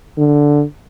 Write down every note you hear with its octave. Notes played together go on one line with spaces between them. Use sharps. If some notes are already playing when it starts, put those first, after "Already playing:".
D3